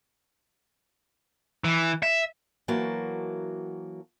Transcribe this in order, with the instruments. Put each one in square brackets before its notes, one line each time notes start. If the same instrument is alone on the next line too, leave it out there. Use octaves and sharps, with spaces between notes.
[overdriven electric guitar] E3
E5
[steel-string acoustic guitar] E3 F#3 A#3 F#4 A5